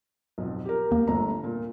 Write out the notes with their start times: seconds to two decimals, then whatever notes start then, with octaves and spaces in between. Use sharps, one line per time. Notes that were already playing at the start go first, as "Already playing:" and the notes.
0.38 B1 F2
0.65 G4 A#4
0.91 D#2 A#3
1.08 G1 A3 A#5
1.44 A#2